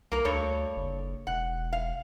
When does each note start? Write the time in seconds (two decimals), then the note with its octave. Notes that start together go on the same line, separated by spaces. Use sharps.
0.12 C2 A#3 A#4
0.25 D2 G2 A4 C#5
0.76 F#1
1.27 E1 F#5
1.73 F5